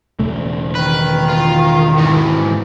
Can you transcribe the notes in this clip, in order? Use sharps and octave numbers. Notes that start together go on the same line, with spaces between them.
E1 C#3 A3
D#3 B4
F4
G#2 E3